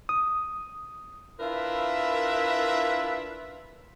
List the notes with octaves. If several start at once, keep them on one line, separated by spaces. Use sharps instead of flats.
D#6
D4 E4 F4 A#4 B4 E5